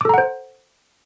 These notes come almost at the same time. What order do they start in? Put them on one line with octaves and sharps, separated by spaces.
D6 A4 A#5 F#5 C5